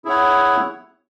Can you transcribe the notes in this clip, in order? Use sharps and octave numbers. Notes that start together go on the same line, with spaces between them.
E4 G#4 C#5 F#5